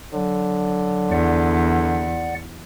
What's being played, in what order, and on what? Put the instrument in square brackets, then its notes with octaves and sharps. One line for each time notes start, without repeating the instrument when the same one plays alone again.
[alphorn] D3 [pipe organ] F#3
[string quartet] E2 [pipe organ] D5 F#5